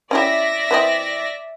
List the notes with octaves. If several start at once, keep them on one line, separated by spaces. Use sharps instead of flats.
C#4 E4 G4 D5 E5 A#6
E3 C4 D#5